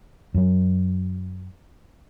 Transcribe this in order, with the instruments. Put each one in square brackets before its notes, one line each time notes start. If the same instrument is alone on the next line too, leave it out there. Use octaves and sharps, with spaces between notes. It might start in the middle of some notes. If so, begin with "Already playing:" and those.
[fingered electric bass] F#2 F#3